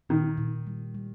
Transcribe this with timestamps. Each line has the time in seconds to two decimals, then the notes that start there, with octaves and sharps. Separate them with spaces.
0.09 A#2 D#3
0.37 A#2
0.67 G3
0.95 G3